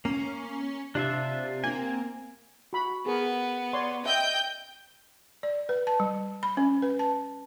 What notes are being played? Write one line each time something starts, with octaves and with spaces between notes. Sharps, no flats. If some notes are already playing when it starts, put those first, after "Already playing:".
A#3 C#4
C3 D4 F4 E5
A#3 C4 G#5
F#4 B5
B3 G#4 A#4
C#5 D5 C6
D#5 E5 G5 G6
D5
B4
A5
G3
B5
C#4
B4
A5